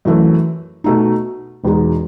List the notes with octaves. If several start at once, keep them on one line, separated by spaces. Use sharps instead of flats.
F#2 E3 A3
B2 A3 D#4
E1 E2 B2 G#3 D#4